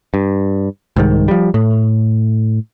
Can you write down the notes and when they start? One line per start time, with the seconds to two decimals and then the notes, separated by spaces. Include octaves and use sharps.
0.14 G2
0.96 C2 G#2 D#3
1.28 F3 G3
1.54 A2